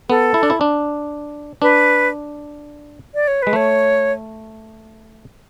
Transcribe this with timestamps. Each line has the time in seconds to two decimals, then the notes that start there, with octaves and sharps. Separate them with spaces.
0.09 B3 A4
0.34 E4
0.43 D4
0.50 E4
0.61 D4
1.62 D4 B4
3.15 D5
3.28 C#5
3.42 G#3 B4
3.53 A3 C#5